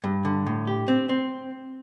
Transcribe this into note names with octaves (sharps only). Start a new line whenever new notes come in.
G2
D3
A2
G4
C4
C4